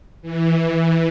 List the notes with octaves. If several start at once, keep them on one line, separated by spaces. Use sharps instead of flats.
E3